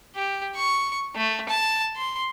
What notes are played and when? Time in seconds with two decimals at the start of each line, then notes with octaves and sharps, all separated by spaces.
0.16 G4
0.55 C#6
1.15 A3
1.49 A5
1.97 C6